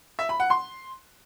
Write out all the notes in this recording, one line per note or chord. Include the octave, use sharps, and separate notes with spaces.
E5
B5
F#5
C6